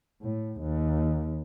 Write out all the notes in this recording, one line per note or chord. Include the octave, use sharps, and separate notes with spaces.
A2
D#2